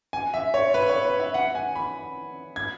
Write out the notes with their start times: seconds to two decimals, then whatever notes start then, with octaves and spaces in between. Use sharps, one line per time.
0.13 G#5
0.34 E5
0.54 C#5
0.74 B4
0.90 C#5
1.05 B4
1.20 E5
1.34 F#5
1.55 G#5
1.76 B5
2.56 G#6